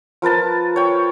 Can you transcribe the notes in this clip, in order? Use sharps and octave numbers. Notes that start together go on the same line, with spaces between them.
F3 A#4 B4 A5
C#5 G5